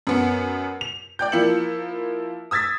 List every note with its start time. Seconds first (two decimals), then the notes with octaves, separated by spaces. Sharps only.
0.07 F#2 B3 C#7
0.81 F7
1.19 D5 G5 G6
1.32 F3 A#3 E4 C#7 F#7
2.51 D#6 E6 G#6 A6 B6